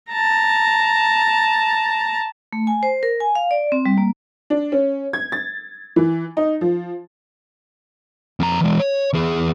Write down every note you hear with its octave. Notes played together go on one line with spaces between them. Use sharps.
A5 A#5
A3
G#5
C5
A#4
G#5
F5
D5
C4
G3
A#3
D4
C#4
G#6
A6
E3
D#4
F3
F2 A#5
E3 G#3
C#5
E2 G#4